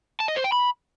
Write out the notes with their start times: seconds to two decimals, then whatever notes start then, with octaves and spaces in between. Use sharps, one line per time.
0.20 A5
0.28 D#5
0.36 C5
0.44 G5
0.52 B5